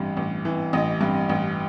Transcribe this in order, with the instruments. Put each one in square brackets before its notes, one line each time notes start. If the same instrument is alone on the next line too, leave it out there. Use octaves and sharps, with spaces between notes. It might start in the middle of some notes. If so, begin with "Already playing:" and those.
Already playing: [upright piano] A1 G2 E3
A1
E3
A1 D#5
G2
A1